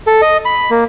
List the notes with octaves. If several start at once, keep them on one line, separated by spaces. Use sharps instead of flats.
A4
D#5
B5
A#3